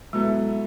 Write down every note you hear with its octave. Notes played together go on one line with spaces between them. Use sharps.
B2 F#3 G#3 B3 E4 A4